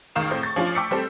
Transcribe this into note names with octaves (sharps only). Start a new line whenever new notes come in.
C#2 D#3 F5 D#6 E7
A2 C4
C#6 A6
F3 C#4 D4 F4
G5 C#6 D6 E6 B6 C#7
G3 C4 A4